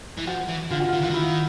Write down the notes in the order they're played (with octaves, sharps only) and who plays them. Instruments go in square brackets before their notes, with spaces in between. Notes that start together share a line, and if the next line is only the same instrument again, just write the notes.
[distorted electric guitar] E3
[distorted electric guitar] F3 [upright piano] F#4
[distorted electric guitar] E3
[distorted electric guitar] D3 [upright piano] F4
[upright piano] F#4
[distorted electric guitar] D#3 [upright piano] F4
[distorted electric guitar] E3 [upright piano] F4
[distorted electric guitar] D#3 [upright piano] E4